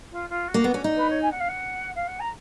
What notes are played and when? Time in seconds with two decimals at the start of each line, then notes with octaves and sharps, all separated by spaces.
0.11 F4
0.29 F4
0.47 F#4
0.54 A#3
0.64 B3
0.74 C#4
0.84 D#4
0.96 B4
1.09 C#5
1.22 G#5
1.30 F#5
1.39 F5
1.48 F#5
1.95 F5
2.07 F#5
2.19 A#5